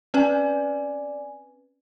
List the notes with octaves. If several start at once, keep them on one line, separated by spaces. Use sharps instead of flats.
C4 C#4 B4 D5 G#5